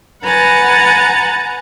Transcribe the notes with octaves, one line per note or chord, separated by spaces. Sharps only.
B4 F#5 G#5 A#5 F#6 A6